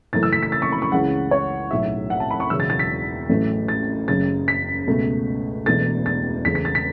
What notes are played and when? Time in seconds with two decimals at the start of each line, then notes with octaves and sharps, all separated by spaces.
0.13 F#1 F#2 E3 A3 A6
0.23 E6
0.33 B6
0.43 B6
0.52 A6
0.62 C#6
0.72 B5
0.82 C#6
0.92 C#2 C#3 E3 F#5
1.31 C#5
1.71 B1 A2 F#3 E5
2.10 F#5
2.20 A5
2.31 B5
2.40 C#6
2.50 E1 E2 C#3 F#3 E6
2.60 A6
2.70 A6
2.79 B6
3.29 A1 A2 F#3 A3
3.68 A6
4.08 F#1 F#2 C#3 A6
4.48 B6
4.87 C#2 B2 A3
5.66 E1 E2 B2 A3 A6
6.06 A6
6.45 E2 C#3 A3 B6
6.55 B6
6.65 A6
6.75 B6